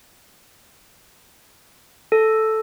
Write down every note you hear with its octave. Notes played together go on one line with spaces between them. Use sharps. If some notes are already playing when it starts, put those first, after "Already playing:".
A4